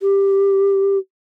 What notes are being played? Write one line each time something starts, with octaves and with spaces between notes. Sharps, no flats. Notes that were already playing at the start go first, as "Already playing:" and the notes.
G4